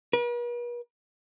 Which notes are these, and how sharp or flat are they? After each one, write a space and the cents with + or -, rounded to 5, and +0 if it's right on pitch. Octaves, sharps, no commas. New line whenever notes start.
B4 -45